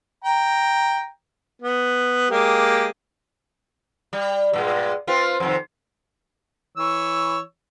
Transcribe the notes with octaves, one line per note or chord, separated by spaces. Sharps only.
G5 A#5
B3
G#3 A#3 G4
G3
G2 A#2 G#3
C4 F4 B4
F2 C3 D#3
E3 C#5 E6